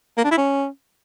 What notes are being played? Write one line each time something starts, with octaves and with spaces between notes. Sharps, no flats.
A#3
D4
E4
C#4